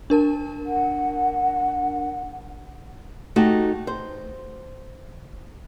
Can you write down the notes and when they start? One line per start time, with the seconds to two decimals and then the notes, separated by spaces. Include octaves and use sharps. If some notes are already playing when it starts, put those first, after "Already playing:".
0.10 D4 A#4 A5
0.66 F#5
3.36 A3 D#4 F#4 G4
3.87 C5